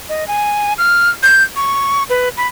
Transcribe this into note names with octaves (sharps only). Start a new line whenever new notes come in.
D#5
G#5
F6
G6
C#6
B4
B5